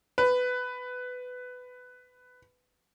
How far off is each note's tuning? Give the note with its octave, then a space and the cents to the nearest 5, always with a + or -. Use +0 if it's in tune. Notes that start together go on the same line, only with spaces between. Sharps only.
B4 +15